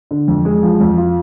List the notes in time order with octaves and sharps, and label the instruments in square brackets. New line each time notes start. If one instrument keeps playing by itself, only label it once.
[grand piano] D3
F2
G#3
F3
F2
F4